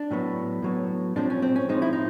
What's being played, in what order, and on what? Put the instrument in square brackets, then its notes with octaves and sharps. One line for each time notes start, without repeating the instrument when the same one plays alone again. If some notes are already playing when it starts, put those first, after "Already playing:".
Already playing: [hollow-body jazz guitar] D4
A2 F#3 B3
A2 F#3 B3
A2 F3 G#3 C4 D4
C#4
C4
C#4
A2 F3 G#3 C4 D#4
E4
D#4